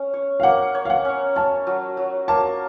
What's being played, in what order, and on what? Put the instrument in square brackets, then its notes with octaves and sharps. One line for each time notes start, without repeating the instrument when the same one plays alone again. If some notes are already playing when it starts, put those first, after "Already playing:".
Already playing: [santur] C#4
C#5
[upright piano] F5
[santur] A#3 [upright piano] F#5
[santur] C#5
[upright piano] F5
F#5
[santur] C#4
[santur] C#4 [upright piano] A5
[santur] F#3
F#3
[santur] A#3 [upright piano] A5